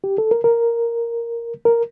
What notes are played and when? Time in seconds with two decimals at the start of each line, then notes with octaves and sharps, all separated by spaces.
0.04 G4
0.18 A4
0.31 A#4
0.44 A#4
1.65 A#4